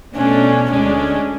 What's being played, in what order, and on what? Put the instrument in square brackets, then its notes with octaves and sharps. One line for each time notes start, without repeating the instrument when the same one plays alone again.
[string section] B2 A3 D4 [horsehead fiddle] C#4
[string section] D2 D3 G#3 D4 [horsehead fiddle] C#4